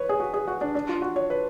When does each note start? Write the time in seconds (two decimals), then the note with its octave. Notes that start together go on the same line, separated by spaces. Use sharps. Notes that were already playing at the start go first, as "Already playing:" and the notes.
Already playing: B4 C#5
0.09 G#4
0.20 F#4
0.34 G#4
0.47 F#4
0.61 D4
0.75 D4
0.89 F4
1.02 F#4
1.16 C#5
1.30 B4